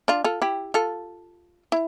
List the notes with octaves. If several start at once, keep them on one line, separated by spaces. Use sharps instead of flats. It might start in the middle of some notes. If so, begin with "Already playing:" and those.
D4 F4
F4 A4
E4 G4
F4 A4
E4